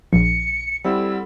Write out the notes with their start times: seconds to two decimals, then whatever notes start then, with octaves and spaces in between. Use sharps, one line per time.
0.13 A#1 C#7
0.84 G3 C4 E4 A4 F#5 E6